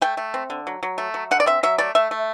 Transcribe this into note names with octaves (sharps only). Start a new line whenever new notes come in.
A3 G5
A3
C4
D3
F#3
F#3
A3
F#3
D3 F#5
D5
C4 E5
F#3 E5
A3 D5
A3 E5
A3